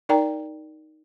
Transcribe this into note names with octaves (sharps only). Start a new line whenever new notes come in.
D#4 A#4 D5 G5 A#5